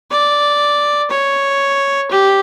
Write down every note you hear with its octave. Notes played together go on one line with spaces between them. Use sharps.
D5
C#5
G4